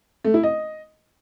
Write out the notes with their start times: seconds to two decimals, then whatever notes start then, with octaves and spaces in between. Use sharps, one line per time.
0.24 A3
0.34 E4
0.43 D#5